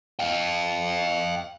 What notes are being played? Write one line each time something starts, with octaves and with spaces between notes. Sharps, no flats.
F5 G5